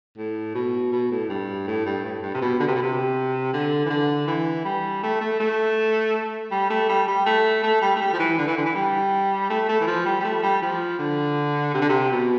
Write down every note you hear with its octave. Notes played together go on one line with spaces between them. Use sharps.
A2
B2
B2
A2
G2
A2
G2
A2
G2
C3
B2
D3
C3
B2
C3
D3
E3
D3
E3
G3
A3
A3
A3
G3
A3
G3
G3
A3
A3
G3
A3
G3
F3
E3
D3
E3
D3
E3
G3
A3
A3
E3
F3
G3
G3
A3
G3
F3
D3
C3
D3
C3
B2